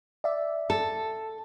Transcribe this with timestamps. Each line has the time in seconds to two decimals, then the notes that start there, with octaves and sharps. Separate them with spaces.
0.24 D5 E5
0.70 A4